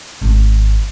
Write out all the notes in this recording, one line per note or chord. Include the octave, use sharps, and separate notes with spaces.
G#1